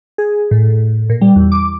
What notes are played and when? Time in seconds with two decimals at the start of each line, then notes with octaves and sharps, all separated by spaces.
0.18 G#4
0.51 A2
0.70 A2
1.10 A#2
1.21 G3
1.36 E2
1.52 D6